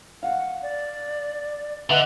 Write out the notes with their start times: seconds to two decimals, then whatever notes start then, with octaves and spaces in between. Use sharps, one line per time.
0.23 F5 F#5
0.63 D5
1.90 D3 B4 D#5 E5 F#5